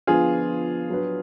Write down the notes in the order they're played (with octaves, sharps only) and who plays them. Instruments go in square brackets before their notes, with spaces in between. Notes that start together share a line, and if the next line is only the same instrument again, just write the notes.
[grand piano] D3 F3 B3 D4 [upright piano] F4 G#4
[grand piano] F#3 D4 F#4 B4